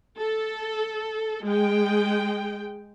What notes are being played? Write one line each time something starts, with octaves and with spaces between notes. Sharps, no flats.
A4
G#3 G5